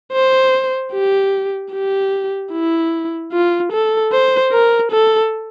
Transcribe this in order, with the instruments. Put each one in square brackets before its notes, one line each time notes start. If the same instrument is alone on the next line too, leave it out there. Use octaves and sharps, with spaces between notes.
[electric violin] C5
G4
G4
E4
F4
A4
C5
A#4
A4